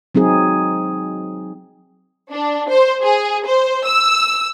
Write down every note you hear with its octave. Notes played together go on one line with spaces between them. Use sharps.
F#3 C4 D#4 G#4
D4
C5
G#4
C5
E6